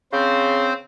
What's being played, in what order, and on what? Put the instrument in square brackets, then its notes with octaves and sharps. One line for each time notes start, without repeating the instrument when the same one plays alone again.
[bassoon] C#3 [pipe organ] C4 C5